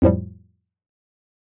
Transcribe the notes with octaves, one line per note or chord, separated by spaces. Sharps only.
F2 A2 F3 G3